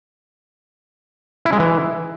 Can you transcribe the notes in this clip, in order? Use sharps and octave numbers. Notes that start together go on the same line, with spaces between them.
E4
G#3
E3